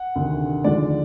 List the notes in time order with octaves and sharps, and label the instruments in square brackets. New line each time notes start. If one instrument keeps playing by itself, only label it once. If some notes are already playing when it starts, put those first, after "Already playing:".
Already playing: [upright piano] F#5
D2 C3 D#3
D#2 D3 F3 G#3 D5